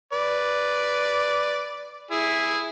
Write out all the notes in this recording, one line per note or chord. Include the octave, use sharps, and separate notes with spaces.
B4 D5
E4 G#4